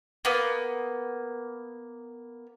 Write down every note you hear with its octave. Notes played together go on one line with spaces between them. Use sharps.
A#3 B3